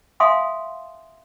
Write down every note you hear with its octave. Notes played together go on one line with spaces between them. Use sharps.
E5 F5 G#5 C6 D#6